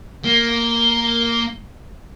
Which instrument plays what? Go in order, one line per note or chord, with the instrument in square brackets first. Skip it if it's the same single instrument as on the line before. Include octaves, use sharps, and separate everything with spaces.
[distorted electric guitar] A#3 [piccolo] G7